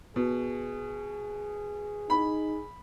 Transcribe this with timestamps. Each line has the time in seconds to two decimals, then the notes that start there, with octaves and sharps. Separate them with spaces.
0.16 B2 G#4
2.10 D#4 B5